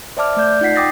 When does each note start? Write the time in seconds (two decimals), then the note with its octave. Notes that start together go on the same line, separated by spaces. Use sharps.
0.17 C5 D5 E5 A5 D6 F6
0.37 A3 D5 G6
0.61 D#4 F4 F#5 B6 C7
0.76 G5 D6 D#6 A6 A#6